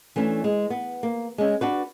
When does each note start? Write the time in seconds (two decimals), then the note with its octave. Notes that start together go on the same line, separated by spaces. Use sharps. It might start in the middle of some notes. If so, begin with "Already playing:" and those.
0.16 E3 A3 C#4 D4
0.44 G#3
0.70 B3
1.03 A#3
1.38 G#3 C#4
1.61 D4 F#4 B4